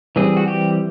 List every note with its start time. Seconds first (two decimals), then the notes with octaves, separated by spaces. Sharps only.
0.16 E3 G3 C4 G#4
0.37 F#4
0.48 G4